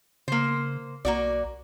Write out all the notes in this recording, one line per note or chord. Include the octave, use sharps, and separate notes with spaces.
C#3 A#3 C5
B1 A#3 F#4 D5